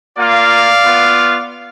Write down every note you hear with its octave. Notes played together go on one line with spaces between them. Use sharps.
A#3 F4 D5 F5
B3 F4